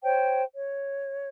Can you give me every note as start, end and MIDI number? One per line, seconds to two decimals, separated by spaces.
0.03 0.42 72
0.03 0.42 73
0.03 0.42 79
0.56 1.28 73